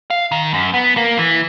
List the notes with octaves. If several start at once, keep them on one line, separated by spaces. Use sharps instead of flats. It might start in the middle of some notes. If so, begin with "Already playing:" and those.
F5
D#3
F#2
B3
A#3
E3